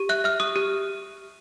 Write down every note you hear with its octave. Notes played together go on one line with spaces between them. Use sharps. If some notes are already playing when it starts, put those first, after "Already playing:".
Already playing: G4
E5 F#6
E5 F6
G4 D#6
G4